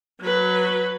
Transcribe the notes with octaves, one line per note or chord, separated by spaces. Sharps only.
F#3 B4